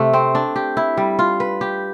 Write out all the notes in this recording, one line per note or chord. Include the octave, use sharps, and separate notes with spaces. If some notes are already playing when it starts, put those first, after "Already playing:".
Already playing: C3 A3
C4
D4
G4
E4
G3
F4
B4
G4